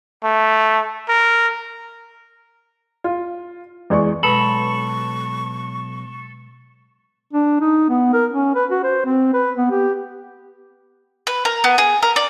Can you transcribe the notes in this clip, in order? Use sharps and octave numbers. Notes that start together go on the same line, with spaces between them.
A3
A#4
F4
E2 G#3 D5 C#6
B1 B2 G#3 A4 B4 B5 C#6
D4
D#4
B3
A#4
C#4
B4
F#4
C5
C4
B4
B3
G4
B4
A#4
B3
G#4
A#4
D5